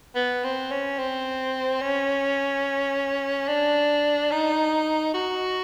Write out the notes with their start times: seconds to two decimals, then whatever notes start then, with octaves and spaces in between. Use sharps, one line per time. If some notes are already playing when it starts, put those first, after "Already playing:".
0.15 B3
0.44 C4
0.71 C#4
0.99 C4
1.81 C#4
3.48 D4
4.32 D#4
5.14 F#4